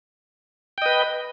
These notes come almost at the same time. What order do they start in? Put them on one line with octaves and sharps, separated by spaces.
G5 D#5 B4